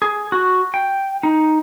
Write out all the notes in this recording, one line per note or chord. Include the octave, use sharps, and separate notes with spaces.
G#4
F#4
G5
D#4